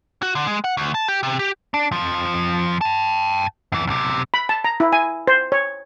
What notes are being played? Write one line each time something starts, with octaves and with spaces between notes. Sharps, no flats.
F#4
D3
G#3
F#5
D2
A5
G4
C3
G4
D4
F2 F3
G5 A5
F#2 E3
B1 C3
B5
A5
A#5
E4
G#5
C5
C#5